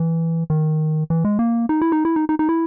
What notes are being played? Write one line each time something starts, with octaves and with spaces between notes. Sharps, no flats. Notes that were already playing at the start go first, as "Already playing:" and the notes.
Already playing: E3
D#3
E3
G#3
A#3
D#4
E4
D#4
E4
D#4
D#4
D#4
E4